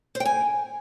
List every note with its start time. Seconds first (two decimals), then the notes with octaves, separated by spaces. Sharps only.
0.15 C5
0.20 G5
0.25 G#5